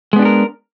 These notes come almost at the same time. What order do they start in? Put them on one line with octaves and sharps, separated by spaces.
G#3 B3 D4 G4 A#4